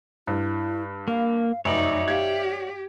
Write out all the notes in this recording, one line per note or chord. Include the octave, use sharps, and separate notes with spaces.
G2 E4
A#3 F5
F1 F#2 D#4 C#5 D5 E5
G4 F5 G#6